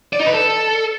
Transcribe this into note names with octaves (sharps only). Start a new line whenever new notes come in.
D5
D#4
B4
A4